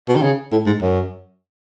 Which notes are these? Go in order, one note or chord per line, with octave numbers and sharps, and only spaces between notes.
B2
D#3
C#3
A2
G#2
F#2